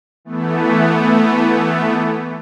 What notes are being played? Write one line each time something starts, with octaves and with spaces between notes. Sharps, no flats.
E3 A3 B3